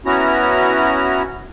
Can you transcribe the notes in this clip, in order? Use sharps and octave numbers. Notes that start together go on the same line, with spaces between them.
B3 C#4 E4 F#4 A#5